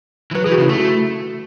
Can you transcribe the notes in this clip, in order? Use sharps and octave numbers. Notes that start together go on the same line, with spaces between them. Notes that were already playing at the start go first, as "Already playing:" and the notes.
E3
F#3 B4
E3 G#4
F#4
C#3
E4
A3 F#4